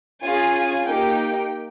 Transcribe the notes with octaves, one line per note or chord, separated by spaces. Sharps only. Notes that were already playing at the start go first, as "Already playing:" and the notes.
C#4 F4 G#4 G#5
A#3 D#4 G4 G5